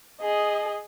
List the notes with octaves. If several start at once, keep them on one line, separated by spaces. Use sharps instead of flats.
G#4 D#5